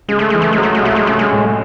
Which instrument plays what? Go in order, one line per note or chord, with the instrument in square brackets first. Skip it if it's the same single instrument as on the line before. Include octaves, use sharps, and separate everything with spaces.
[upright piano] C#3 [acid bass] G#3
[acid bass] A3
[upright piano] E3 [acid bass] G#3
[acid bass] A3
[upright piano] F#3 [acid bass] G#3
[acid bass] A3
G#3
[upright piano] C2 [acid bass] A3
[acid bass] G#3
[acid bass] A3 [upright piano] C#4
[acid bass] G#3
[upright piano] A2